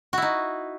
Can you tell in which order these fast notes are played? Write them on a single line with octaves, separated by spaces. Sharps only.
F#4 E4 D#4